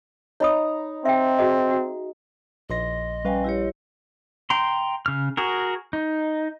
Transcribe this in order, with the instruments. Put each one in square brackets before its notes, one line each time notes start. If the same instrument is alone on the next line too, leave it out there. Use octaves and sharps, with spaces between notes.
[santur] D#4 A#5 [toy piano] C#5 B5 D#6
[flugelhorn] C4 [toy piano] E5 G5
[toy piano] F#4 G#4 D#5
F#4
[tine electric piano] A#1 C6 A#6 [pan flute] D#5
[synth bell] G3 B4 F5 [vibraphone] C#4 G5 G#5
[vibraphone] E4 G4 C#5
[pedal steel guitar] G5 A#5 C6
C#3 F6
F#4 G#4 A#4
D#4